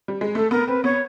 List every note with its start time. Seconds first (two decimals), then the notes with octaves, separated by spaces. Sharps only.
0.08 G3
0.21 G#3
0.35 A3 A4
0.51 B3 A#4
0.68 C4 B4
0.84 B3 C#5